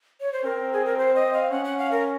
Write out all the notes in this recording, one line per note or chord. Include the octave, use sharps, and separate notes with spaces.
C#5
C5
C4 A#4
G#4
A#4
C5
D#5
F5
C#4 F#5
F#5
F5
A#4